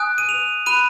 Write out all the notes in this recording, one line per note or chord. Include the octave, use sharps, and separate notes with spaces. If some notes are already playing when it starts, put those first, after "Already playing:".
Already playing: G#5 D#6 F#6
D#7
F7
B5 F#6 D#7